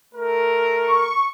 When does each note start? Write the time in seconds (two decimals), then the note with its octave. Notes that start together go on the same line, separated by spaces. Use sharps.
0.14 A3 A#4
0.83 C#6